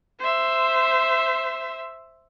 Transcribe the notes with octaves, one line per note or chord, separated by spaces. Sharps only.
C5 E5